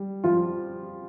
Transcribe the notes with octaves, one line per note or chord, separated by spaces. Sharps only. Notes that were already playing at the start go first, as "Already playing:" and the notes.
Already playing: G3
F3 F4